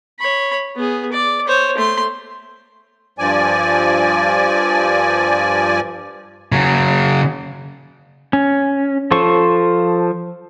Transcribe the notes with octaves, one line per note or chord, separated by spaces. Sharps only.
C#5 B5
B3 G#4
D5
C5 C#5
A3 C6
G2 F3 D5 G#5
C#3 F#3
C#4
F3 A4 C5 C#6